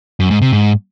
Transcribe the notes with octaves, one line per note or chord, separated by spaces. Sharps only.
F#2
G#2
C3
G#2